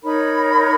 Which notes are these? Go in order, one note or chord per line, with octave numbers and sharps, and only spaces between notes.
D#4 A#4 C#5 B5